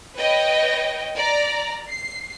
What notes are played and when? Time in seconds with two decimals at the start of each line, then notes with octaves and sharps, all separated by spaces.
0.16 B4 C#5 D#5 G5
1.16 D5 A#5
1.89 C7